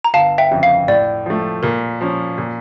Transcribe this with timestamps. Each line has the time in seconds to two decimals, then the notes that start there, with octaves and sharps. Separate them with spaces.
0.04 A#5
0.14 G1 F5 A5
0.38 E5 G5
0.51 F2 C#3
0.63 F5
0.88 A2 D5
1.26 F3 A3
1.63 A#2 A#4
2.01 F3 C#4
2.38 A#2